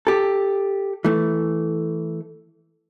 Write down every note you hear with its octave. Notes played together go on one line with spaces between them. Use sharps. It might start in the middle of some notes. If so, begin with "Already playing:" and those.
G4 A4
E3 A3